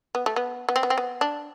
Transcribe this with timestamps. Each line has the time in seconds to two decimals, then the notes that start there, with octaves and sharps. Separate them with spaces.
0.15 B3
0.26 A3
0.36 B3
0.69 B3
0.76 C4
0.83 B3
0.90 C4
0.98 B3
1.21 D4